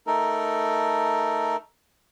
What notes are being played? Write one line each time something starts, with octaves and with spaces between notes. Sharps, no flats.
A3 D#4 A4 A#4